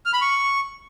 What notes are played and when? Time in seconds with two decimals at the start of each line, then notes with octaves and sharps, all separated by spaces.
0.06 F6
0.13 B5
0.21 C#6